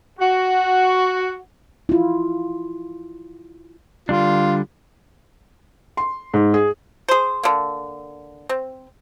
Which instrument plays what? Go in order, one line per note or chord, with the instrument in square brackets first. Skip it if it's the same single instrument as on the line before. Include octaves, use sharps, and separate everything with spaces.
[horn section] F#4
[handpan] E4 F4
[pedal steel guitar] D3 G3 D4 [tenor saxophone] F4
[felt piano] C6
G#2
G#4
[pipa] G#4 C5
D3 A#3
C4